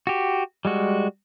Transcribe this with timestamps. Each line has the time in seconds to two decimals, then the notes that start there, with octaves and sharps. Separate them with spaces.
0.07 F#4 G4
0.65 G3 G#3 F#4